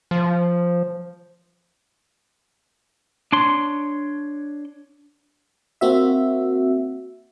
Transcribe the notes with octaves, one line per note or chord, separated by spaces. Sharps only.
F3
D4 C#5 C6
A#3 C4 F#4 E5